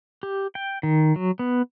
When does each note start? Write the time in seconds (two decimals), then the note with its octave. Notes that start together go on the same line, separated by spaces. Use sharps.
0.23 G4
0.55 G5
0.83 D#3
1.16 F#3
1.39 B3